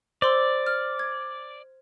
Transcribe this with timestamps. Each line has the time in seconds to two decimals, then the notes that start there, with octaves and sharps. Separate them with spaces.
0.22 C5 D5 C6 E6
0.66 F6
0.99 G#6